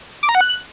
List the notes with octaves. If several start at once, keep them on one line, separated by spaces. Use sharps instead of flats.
D6
A#5
F#5
F#6